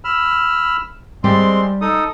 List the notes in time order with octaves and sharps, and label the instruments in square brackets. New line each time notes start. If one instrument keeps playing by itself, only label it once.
[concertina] B5 E6 F6
[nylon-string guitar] G3 G4 D5 [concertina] G#3 C4 C6
[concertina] D#4 A4 D#6